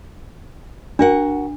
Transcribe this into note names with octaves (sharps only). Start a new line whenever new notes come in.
D4 F#4 A#4 F#5